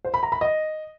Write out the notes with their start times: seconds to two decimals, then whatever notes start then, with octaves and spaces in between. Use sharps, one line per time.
0.05 C5
0.14 B5
0.23 A#5
0.32 B5
0.41 D#5